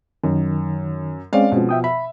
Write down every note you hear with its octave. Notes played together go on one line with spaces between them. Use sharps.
F#2 D#3
G#3 C4 C#4 D5 F5
B2 F3
E5 G5 D#6
E5 B5